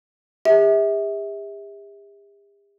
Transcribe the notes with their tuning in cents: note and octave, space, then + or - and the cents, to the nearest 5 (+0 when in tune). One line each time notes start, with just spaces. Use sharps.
G4 +45 E5 -30